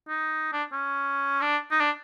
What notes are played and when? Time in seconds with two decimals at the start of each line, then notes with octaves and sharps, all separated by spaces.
0.09 D#4
0.53 D4
0.72 C#4
1.42 D4
1.71 D#4
1.80 D4